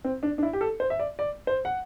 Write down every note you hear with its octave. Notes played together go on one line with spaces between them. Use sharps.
C4
D4
D4
E4
G4
A4
C5
E5
D5
D5
C5
F#5